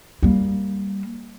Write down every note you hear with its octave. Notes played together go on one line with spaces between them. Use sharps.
G3 A#3